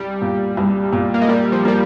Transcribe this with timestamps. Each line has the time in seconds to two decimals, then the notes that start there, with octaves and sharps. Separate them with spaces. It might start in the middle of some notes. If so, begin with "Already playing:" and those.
Already playing: C2 G3
0.22 A#2
0.57 C2
0.92 A#2
1.14 A#3
1.21 G#3
1.28 G3 A#3
1.52 F3
1.65 G3 A#3